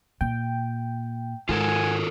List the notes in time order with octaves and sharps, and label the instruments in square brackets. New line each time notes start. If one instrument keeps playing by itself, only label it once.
[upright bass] A#2 [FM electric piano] G5
[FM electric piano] G#2 [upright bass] D#3 [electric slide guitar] F4 A4 A#4 [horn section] F#5 G#5